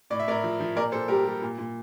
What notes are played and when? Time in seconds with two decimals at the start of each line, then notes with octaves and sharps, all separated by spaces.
0.10 A2 D5
0.19 E5
0.28 A2 A#4 D5
0.44 F3
0.60 F3
0.76 A#2 A#4 D5
0.92 A#2 A4 C5
1.08 G3 G4 A#4
1.25 G3
1.42 A#2
1.58 A#2